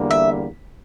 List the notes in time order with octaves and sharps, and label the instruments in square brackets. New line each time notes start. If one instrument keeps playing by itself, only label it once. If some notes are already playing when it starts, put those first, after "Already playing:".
Already playing: [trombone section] E2 D3 G3 A#3
[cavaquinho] E5